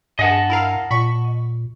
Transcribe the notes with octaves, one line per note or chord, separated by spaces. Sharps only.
G2 G#4 D#5 F#5 A5
E4 A#4 F5
A#2 B5 C#6